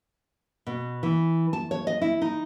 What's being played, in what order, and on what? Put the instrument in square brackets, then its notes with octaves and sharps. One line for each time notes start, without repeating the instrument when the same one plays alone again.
[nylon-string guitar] B2
E3
A5
C#5
D#5
E4
D#4